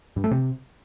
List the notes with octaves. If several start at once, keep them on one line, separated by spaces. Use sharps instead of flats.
G2
A3
C3